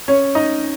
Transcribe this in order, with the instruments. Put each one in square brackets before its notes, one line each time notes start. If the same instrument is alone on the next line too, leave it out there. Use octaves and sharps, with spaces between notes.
[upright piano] C#4 C#5
D#4 D#5